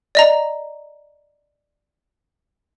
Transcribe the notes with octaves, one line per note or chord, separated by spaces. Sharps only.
D5 D#5 A#5